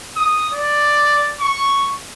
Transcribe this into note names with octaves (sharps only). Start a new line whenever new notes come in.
D#6
D5
C#6